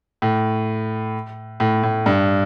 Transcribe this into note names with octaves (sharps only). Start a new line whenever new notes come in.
A2
A2
A2
G2